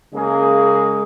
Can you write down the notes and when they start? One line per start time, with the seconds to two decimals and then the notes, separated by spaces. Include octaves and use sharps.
0.14 C#3 G#3 A#3 G#4